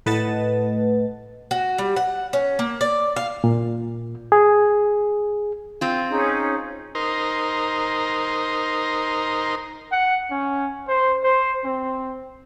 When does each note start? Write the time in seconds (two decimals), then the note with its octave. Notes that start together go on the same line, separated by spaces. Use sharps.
0.06 A2 B4 D#5 F#5 A5 A6
1.51 F#4
1.78 G3
1.96 F#5
2.33 C#4
2.59 A#3
2.81 D5
3.16 F5
3.44 A#2
4.32 G#4
5.81 C4 F4
6.10 C#4 D#4 G#4
6.95 D#4 A#4 C5
9.92 F#5
10.31 C#4
10.88 C5
11.23 C5
11.65 C4